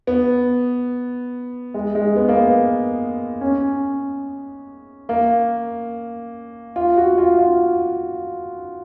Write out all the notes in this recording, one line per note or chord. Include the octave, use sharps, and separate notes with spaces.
B3
G#3
G#3
B3
A#3
B3
C#4
A#3
F4
F#4
F4
F4